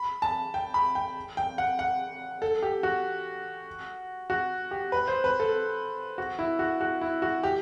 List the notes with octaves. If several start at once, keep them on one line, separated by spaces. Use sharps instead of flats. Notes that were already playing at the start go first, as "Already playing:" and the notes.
Already playing: B5
A5
G5
B5
G5
G5
F#5
F#5
A4
G4
F#4
F#4
G4
B4
C5
B4
A4
F#4
E4
F#4
F#4
E4
F#4
G4